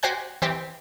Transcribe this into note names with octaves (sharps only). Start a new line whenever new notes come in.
F#4 G4 C5 G#5 F#6
E3 C4 G4